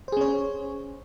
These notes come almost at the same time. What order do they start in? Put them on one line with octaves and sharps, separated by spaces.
C5 G#4 C#4 C#5